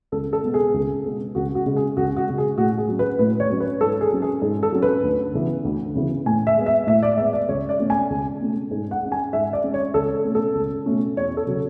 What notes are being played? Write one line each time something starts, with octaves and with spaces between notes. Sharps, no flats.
C#2 A4
A4
B2 G#3 B3
G#4
C#2
B2 G#3 B3
C#2 F#4
F#4
C#3 G#3
G#4
C#2 F#4
F#4
C#3 G#3
G#4
A2 F#4
G#4
F#3 C#4
B4
A2 B4
C#5
F#3 C#4
B4
G#2 A4
G#4
F#3 C#4
G#4
G#2
A4
F#3 C#4
B4
D2
C#3 E3 B3
D2
C#3 E3 B3
A2 G#5
E5
G#3 B3
E5
A2 E5
D5
G#3 B3 E5
D5
C#2 C#5
D5
B2 A3 C#4
G#5
C#2
B2 A3 C#4
G#2
F#5
G#3 C#4
G#5
G#2 E5
D5
G#3 C#4
C#5
C#2 A4
B2 A3 C#4
A4
C#2
B2 A3 C#4
E2 C#5
A4
C#3 F#3